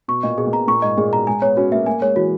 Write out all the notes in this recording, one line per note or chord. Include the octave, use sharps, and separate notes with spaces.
B2 C#6
A#2 D#5
B2 G#4
A#2
B2 A#5
A#2 C#6
G#2 D#5
A#2 G#4
B2 A#5
G#3 G#5
B3 C#5
C#4 F#4
A#3 E5
A#3 G#5
G#3 C#5
E3 F#4